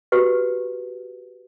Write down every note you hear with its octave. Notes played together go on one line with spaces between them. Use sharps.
F#4 G4 B4